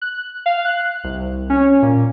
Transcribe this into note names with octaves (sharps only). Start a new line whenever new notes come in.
F#6
F5
F#6
C2
C#4
A#2